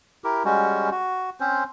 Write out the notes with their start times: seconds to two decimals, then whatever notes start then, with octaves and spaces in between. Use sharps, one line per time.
0.24 E4 G4 A#4
0.45 G3 G#3 C#4 F#4
0.91 F#4
1.40 C4 C#4 C5